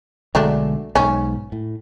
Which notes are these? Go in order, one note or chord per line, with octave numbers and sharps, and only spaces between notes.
B1 D3 F#3 G#3 A3 D4
B1 G#2 C#4
A2